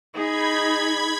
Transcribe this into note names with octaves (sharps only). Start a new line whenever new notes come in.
D#4 G#4 B5 G#6